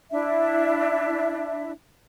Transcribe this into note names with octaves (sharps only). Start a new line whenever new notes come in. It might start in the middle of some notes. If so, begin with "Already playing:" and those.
D4 E4 E5